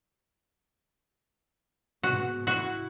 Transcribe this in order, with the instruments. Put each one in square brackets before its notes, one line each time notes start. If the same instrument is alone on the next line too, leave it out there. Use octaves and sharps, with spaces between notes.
[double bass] G#2 B2 [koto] F#4
[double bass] E4 [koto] F#4